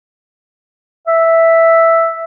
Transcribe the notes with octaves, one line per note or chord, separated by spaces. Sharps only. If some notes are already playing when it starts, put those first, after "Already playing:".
E5